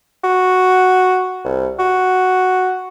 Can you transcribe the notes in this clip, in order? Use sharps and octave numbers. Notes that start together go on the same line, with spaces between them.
F#4
C2
F#4